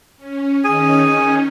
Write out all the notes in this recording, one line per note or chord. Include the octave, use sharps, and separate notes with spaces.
C#4
D#3 C#4 D#4 G#4 G#5